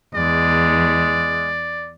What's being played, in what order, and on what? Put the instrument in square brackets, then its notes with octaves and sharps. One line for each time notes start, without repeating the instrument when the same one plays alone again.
[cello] E2 [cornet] G#3 [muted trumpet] D5